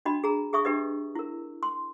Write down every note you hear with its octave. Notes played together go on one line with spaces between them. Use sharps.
D4 F#4 D#5 B5
G#4 A#5
G#4 E5 C#6 D#6
D4 G4 B4 D#5
E4 A#4
C6